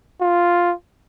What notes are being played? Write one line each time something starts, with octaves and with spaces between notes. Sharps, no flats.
F4